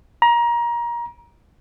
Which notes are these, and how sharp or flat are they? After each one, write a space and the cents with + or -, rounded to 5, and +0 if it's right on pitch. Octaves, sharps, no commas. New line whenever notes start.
A#5 +25